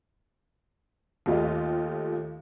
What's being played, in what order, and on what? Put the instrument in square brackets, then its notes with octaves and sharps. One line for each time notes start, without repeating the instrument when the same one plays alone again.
[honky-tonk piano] D#2 A3 F4 G4 D#5